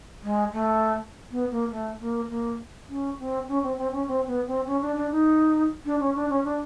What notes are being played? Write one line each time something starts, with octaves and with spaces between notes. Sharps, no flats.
G#3
A3
B3
A#3
A3
A#3
A#3
C#4
C4
C#4
C4
C4
C#4
C4
B3
C4
C#4
D4
D4
D#4
D4
C#4
D4
C#4
D4